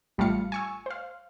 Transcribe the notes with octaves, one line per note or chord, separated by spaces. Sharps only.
A1 G3 A3 F4 F5 C#7
G#5 C#6 E6
C5 F5